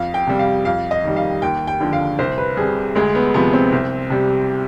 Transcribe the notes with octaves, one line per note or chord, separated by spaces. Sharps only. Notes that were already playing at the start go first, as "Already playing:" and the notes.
Already playing: F2 F5
G5
C3 G3
F5
F2 F5
D#5
D#3 G3
F5
D#2 G5
G5
D3 F3
F5
C2 C5
B4
C3 G3 G#4
D2 G#3
B3
C3 F3 B3
C4
C2
C3 G3